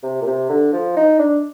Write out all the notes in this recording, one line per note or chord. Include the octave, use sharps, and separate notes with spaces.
C3
A#2
C3
D3
F3
D#4
D4